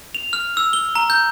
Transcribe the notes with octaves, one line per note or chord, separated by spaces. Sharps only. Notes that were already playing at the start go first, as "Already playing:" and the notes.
F7
F6
E6
G7
A#5
G6